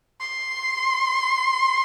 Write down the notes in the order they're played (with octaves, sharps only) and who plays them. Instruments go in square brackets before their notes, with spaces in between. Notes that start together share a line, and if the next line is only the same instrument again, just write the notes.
[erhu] C6